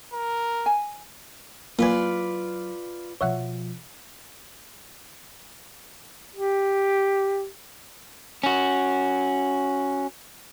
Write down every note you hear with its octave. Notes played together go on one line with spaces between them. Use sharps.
A#4
G#5
F#3 A#3 F4 B4 D5 G#5
B2 F3 C#5 E5 F#5
G4
C#4 F#4